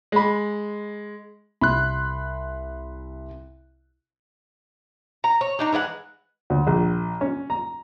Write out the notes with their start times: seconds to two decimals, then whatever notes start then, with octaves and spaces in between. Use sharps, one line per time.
0.12 G#3 B5
1.61 C2 B5 C6 F#6
5.24 A#5
5.41 C#5
5.59 D4 D#4 A#5
5.73 E3 G#3 D#5 F#5
6.50 D2
6.67 A#1
7.21 C#4
7.50 A#5